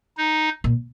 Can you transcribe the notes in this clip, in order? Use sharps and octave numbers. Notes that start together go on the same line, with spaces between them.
D#4
A#2